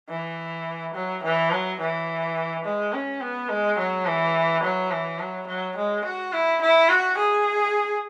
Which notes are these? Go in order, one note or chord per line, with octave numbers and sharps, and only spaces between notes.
E3
F#3
E3
F#3
E3
G#3
C#4
B3
G#3
F#3
E3
F#3
E3
F#3
F#3
G#3
F#4
E4
E4
F#4
G#4